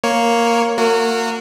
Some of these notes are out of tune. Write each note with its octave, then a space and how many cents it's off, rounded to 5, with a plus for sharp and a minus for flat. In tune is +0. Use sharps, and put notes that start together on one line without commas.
A#3 +0 C#5 +0
A#3 -30 F#4 -25 A#4 -35